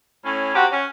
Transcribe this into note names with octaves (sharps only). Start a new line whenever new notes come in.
A2 C#4
C3 F#4 G4
C#4